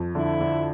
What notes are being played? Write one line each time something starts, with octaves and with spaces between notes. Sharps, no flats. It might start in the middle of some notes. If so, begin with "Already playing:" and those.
Already playing: F2
D3 E4
D3